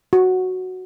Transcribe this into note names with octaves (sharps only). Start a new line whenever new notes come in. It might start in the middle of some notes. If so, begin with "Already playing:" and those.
F#4